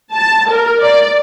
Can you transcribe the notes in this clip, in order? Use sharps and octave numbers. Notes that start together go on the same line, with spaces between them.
A5
A#4
D5